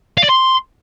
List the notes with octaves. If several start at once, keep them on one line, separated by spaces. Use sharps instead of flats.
F5
D5
C6